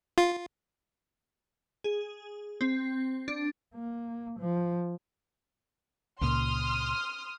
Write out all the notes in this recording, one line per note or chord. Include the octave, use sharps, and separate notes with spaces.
F4
G#4
C4
D4
A#3
F3
C#2 A#2 C6 D#6 F6